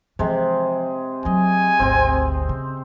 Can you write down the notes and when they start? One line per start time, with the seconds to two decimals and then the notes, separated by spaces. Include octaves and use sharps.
0.19 C3 E3 F3 G#3
1.25 F#3 A3 D#5 G#5
1.79 G#1 D2 C4 C5
2.49 C#3